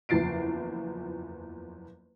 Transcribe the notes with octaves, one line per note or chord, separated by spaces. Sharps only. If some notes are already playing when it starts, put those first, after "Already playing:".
F#1 E2 F3 A6 C7 D7